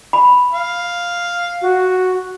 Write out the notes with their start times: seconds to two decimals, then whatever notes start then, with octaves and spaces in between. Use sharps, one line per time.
0.13 B5
0.53 F5
1.62 F#4